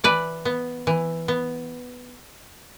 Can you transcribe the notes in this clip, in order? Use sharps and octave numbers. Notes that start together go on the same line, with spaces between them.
E3 B4 D5
B3
E3
B3